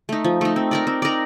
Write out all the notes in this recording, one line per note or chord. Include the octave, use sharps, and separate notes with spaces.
A3 D#4
F3
A3 D#4
C4
D#4 A#4 D5
C4
D#4 A#4 D5